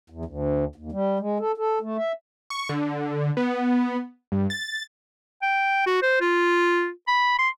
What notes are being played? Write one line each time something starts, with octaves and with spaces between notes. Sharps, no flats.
E2
D2
D#2
G3
G#3
A4
A4
A3
E5
C#6
D3
B3
G2
A6
G5
F#4
C5
F4
B5
C6